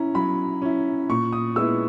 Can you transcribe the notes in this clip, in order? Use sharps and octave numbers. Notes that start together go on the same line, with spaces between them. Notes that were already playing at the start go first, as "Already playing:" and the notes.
Already playing: C#4 E4 A#5
F#3 B5
C#4 E4
A#2 C#6
D#6
G#3 B3 E4 E6